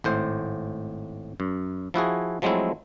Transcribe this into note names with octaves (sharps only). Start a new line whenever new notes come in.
G#1 A2 C5
F#2
F3 E4 F#4 G#4
F3 F#3 G#3 A3 C4 E4